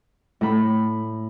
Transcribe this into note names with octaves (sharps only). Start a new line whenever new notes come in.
A2 A3 B5